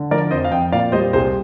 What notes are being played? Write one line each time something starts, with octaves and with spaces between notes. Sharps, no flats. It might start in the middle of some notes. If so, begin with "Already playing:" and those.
Already playing: D3
F3 A#4 D5
F2 C5 D#5
F5
F2 D#5 G5
A#2 D5 F5
G3 C5 D#5
C2 G#4 C5